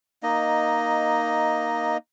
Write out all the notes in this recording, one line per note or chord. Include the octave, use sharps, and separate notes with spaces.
A#3 D#4 D#5